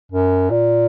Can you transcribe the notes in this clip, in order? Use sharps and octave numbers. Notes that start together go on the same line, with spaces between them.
F#2
A#2